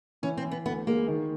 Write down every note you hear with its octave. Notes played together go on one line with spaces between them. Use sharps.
E3 C#4
C4
E3
B3
D2 B3
G#3 A#3
D#3